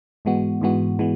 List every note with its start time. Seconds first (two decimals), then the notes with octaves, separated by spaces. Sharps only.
0.25 G#2 E3 G#3 B3 F#4
0.61 G#2 E3 G#3 B3 F#4
0.99 E3 G#3 B3